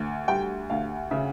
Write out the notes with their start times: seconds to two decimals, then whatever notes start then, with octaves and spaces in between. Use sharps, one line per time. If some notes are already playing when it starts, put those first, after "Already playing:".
Already playing: D2
0.28 G3 G5
0.70 D2 F5
1.11 C#3 E5